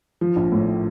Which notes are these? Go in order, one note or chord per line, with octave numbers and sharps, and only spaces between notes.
F3
A#1
A2